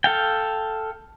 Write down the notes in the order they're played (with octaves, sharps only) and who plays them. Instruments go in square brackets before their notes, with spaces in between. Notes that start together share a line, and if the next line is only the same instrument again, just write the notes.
[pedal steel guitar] A4 F5 G5